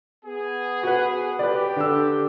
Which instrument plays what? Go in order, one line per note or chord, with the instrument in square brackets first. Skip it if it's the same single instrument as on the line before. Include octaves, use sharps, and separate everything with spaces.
[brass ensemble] B3 G#4
[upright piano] F#4 B4
[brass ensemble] G4 [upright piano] B4 D5
[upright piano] D3 D4 E6